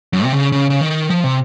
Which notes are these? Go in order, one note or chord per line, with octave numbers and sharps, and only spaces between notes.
F#2
C3
C#3
C#3
C#3
D#3
F3
C3